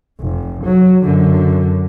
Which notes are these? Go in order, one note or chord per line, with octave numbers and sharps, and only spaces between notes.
F1
F#3
F#2 D3